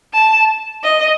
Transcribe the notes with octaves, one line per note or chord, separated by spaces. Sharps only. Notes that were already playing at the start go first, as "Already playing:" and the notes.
A5
D#5